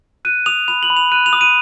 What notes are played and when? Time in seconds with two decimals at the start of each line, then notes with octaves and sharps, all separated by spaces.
0.25 F#6 D#7
0.46 D#6 F7
0.68 B5 F7
0.83 F#7
0.90 B5
0.96 F7
1.12 F#6 D#7
1.26 F7
1.33 D#6
1.41 D#7